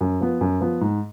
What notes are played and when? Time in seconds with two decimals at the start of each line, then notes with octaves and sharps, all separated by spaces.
0.01 F#2
0.21 F3 B3
0.41 F#2
0.61 F3 B3
0.81 G#2